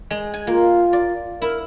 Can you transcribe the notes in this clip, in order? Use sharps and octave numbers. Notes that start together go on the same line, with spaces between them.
G#3
G#5
A#3 F4
D5
E4 A#4